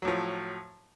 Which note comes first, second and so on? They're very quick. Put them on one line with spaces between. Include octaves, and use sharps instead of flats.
F#3 A2 F3